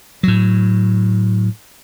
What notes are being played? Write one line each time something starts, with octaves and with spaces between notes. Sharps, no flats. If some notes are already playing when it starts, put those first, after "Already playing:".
A2 F#3